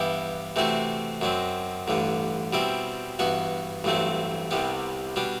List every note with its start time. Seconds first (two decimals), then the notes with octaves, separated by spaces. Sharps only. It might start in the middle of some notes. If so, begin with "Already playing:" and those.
Already playing: G2 E3 B3 E4 G4
0.56 C3 E3 A3 C4 F#4
1.21 F#2 F#3 C4
1.88 A1 G2 D3
2.53 B2 G3 C4 E4
3.19 G2 E3 B3 F#4
3.84 A1 G2 F#3 A3 C4
4.51 C2 C3 G3 B3
5.16 B2 G3 D4